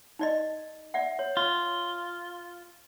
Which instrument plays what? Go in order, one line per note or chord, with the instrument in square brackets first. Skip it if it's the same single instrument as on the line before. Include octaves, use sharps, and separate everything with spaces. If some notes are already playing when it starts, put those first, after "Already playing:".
[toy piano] D#4 D5 D#5
D5 E5 F#5
C#5
[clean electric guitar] F4